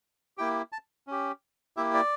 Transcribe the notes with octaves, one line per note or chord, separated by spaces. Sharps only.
A#3 E4 G4 G5
A5
C#4 G4
A#3 E4 G4 E5
D5